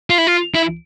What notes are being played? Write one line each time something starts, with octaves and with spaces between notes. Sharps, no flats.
F4
E4
F4
E4